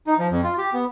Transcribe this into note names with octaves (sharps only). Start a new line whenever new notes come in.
D#4
F3
F2
F4
G4
B3